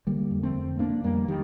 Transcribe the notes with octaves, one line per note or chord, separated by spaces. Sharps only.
D3 G3 A#3
F2
A3 C4
F2
D3 A#3 D4
F2 G3 A#3
D#3 G3